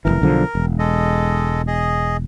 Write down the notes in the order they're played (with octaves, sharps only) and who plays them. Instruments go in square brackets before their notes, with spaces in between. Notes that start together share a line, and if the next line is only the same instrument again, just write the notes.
[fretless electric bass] F1 C#2 E3 [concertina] A#4
[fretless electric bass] B1 D3 F3
E1
[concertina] G#3 A4 D#5
G#4 D#5